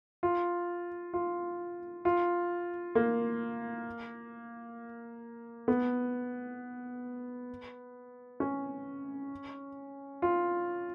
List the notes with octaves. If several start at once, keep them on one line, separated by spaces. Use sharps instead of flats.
F4
F4
F4
A#3
B3
C#4
F4